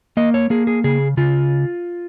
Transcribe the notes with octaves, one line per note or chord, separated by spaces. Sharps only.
A#3 D#5
C#5
A#3 G#4
G#4
C#3 G#4
C#3 F4